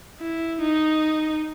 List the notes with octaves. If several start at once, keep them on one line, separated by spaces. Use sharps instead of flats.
E4
D#4